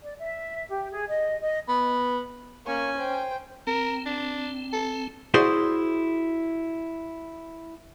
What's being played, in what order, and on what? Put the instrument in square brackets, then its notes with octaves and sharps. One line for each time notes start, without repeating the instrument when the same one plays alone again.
[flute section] D5
E5
G4
G#4
D#5
D#5
[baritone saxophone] B3
[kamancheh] A#3 C#6 [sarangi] C#4 [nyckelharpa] G#5
[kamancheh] C5 G5
[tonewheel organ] C4 [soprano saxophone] A#4
[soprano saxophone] D4
A4
[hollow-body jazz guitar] E4 F#4 G#4 C5 D5